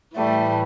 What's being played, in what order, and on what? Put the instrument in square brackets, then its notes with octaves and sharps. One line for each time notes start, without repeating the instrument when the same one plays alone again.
[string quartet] A2 E3 G3 A3